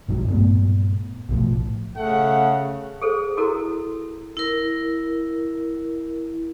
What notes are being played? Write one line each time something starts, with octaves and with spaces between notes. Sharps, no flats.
A#1 G#2 F#3
G2 A#2 A3 B3
B1 A2 F3
C#3 A3 F#5
G#4 A4 C5
E4 F#4 A4 A#4 A#5
E4 A#4